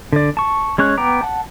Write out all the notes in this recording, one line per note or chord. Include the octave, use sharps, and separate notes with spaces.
D3 D5
A5 C#6
G#3 C#4 C#5 F#6
B3 G5 A#5 D6
F#5 A5